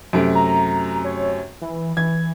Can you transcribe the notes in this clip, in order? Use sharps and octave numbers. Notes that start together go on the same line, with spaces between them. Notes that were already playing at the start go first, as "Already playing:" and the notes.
F#2 C3 A3 D7
A#5
C#5
E3
E3 G#6